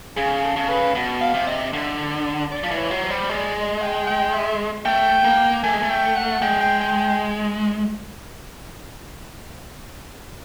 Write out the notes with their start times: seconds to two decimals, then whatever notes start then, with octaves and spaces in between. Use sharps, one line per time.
0.17 C#3 G#4
0.43 A4
0.56 C#3
0.69 B4
0.95 B2
1.21 F5
1.34 C3
1.47 D#5
1.73 D3
2.51 D5
2.64 F3
2.71 E3
2.77 C#5
2.91 F#3
3.03 C5
3.10 G3
3.29 G#3 D5
3.55 D#5
3.82 G5
4.07 G5
4.34 E5
4.85 A3 G5
5.24 A#3
5.63 A3 G#5
5.73 G#3
5.83 A3
5.90 G5
6.16 F#5
6.42 G#3 G5
6.61 G5
6.81 G5
7.00 G5